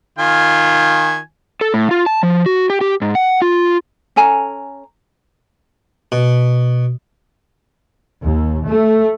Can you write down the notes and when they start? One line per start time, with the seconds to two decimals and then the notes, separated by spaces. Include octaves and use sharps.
0.19 D#3 F4 G#5
1.61 A4
1.74 A2
1.91 F4
2.06 A5
2.23 F3
2.46 F#4
2.70 G4
2.81 G4
3.02 G#2
3.15 F#5
3.42 F4
4.16 C#4 A4 G#5 A#5
6.12 B2
8.22 D#2
8.64 A3